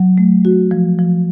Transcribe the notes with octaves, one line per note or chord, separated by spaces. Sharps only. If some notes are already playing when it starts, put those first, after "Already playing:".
Already playing: F#3
A3
F#4
F3
F3